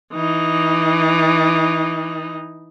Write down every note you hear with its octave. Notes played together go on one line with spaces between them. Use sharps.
E3 D#4